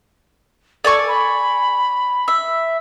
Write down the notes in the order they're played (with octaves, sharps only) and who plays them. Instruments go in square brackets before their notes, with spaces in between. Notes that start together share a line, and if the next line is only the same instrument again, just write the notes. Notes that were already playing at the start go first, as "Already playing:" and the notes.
[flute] A4 [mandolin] D5 G#5 C#6
[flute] B5
[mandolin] E5